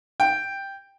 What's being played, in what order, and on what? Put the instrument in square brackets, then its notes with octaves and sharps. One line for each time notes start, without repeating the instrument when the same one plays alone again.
[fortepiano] G5